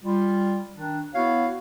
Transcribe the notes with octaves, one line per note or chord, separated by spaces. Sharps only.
G3 F4
D#3 D4
B3 E4 F#4 C#5 F5